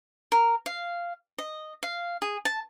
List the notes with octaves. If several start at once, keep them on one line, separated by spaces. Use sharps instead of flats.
A#4
F5
D#5
F5
G#4
A5